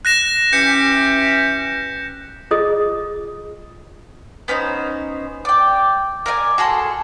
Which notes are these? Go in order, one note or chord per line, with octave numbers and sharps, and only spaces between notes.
F#6 A#6 E7
E3 C#4 G4 G6 C#7
F4 G#4 D#5 D#6
B3 C#4 D#4 C5
D5 G5
A#4 D5 E5 G#5
F#4 G#4 A4 C6